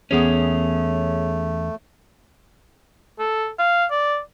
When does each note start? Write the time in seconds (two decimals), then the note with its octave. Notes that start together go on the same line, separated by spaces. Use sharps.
0.11 E2 A3 B3 C#4 G#4 C#5
3.19 A4
3.59 F5
3.91 D5